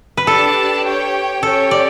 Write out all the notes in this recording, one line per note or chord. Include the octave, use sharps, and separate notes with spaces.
B4
D4 G4 A4 D5 A5
G4 C#5 G5
C#4 G4 A4 C#5 G5
D5